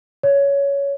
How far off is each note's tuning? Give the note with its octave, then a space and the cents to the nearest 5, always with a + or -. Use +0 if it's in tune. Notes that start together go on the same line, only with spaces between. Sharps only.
C#5 +15